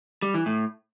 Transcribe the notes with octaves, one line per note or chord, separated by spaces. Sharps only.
G3
E3
A2